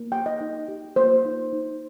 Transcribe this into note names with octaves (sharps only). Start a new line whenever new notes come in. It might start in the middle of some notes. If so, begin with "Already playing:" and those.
Already playing: A#3
G4 G5
D#5
D#4
G4
A#3 C5
D#4
D#4